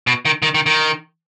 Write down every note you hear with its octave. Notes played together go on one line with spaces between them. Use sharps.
B2
D#3
D#3
D#3
D#3